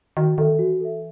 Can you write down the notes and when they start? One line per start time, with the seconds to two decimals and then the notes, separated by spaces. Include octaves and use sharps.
0.17 D#3 F#4
0.38 D#3 A4 E5
0.59 E3 F#4
0.80 A4 E5